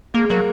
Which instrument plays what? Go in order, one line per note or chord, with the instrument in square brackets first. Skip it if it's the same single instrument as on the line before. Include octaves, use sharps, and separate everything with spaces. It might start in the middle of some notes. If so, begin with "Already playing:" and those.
[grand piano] G#3 [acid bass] A#3
[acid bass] F#3 [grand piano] A#3